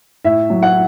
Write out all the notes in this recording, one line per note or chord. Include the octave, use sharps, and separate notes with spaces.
A2 E5
F#3
F#5